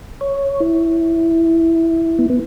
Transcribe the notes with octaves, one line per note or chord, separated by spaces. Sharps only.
C#5
E4
B3
B3